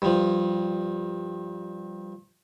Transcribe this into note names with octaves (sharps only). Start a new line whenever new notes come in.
G2 F3